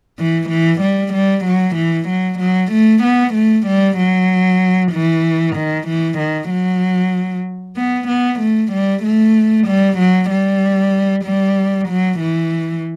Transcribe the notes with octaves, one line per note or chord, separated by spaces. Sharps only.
E3
E3
G3
G3
F#3
E3
F#3
F#3
A3
B3
A3
G3
F#3
E3
D#3
E3
D#3
F#3
B3
B3
A3
G3
A3
G3
F#3
G3
G3
F#3
E3